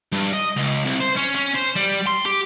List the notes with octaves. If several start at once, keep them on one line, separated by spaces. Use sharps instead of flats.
G2
D#5
C#2
C2
C5
C#4
C#4
C5
G3
C6
G4